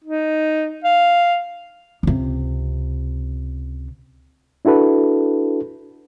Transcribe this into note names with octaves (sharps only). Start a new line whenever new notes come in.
D#4
F5
C#2 C3
D4 E4 F#4 A4 B4